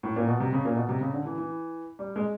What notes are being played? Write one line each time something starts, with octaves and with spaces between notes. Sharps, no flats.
A2
A#2
B2
C3
C#3
A#2
B2
C3
C#3
D3
E3
E3
G3
G#3